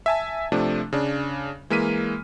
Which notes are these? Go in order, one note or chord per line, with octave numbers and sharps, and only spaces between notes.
E5 G#5 A5
C3 F3 A3 D4
C#3 D4
E3 G#3 A#3 F6 B6 D#7